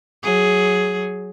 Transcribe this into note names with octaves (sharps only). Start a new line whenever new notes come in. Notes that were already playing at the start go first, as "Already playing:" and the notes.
F#3 G#4